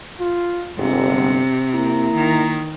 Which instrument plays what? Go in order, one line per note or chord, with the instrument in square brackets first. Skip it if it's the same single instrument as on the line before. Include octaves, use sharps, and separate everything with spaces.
[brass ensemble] F4
[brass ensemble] G1 G#2 [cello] C3
[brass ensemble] A#3 E4 A#5
[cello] D#3